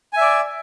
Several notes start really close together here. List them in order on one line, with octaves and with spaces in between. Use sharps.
G#5 E5 D5